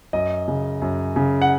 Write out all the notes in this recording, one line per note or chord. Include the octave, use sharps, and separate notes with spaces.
F#2 D#5
C#3
F#2
C#3
F#5